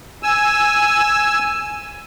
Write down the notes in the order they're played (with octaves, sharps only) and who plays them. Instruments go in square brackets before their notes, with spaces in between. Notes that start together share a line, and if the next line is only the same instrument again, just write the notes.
[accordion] G#5 E6